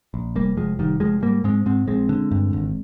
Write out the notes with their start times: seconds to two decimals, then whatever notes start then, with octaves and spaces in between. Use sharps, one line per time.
0.14 A#1
0.35 F1 G3 A#3
0.57 F1 F3 G#3
0.79 F1 D#3 G3
1.00 F1 F3 G#3
1.22 G#2 G3 A#3
1.44 G#2 G#3 C4
1.66 G#2 G#3 C4
1.87 A#1 G#3 C4
2.09 D3
2.31 G2
2.53 G#1